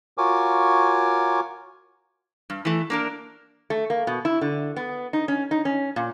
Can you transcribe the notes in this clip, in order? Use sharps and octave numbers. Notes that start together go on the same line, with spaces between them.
F4 F#4 A#4 C#5 G#5 D6
G2
E3 A3
A#3 D4 A#4
A3
A#3
B2
E4
D3
B3
D#4
C#4
D#4
C#4
A#2